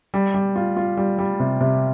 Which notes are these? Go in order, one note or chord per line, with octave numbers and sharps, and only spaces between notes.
G3
G3
F4
F4
G3
G3
C3
C3